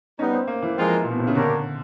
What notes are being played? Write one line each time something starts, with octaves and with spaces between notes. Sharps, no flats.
G3 B3 C#4 D#4
C4
A#3
E3
F3 G#3 C4 F4 A#4
A#2
B2
C3
C#3
D3 A#3 D4 G4 A#4 C#5